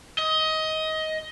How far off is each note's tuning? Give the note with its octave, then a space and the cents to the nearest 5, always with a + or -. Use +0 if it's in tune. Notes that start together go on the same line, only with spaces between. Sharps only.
D#5 +20